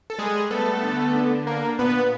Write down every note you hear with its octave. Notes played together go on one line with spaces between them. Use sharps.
A4
G3 G#3 G#4
A3 B3 A4
D3
D4
A#3 D4 A#4
A#2 B3 B4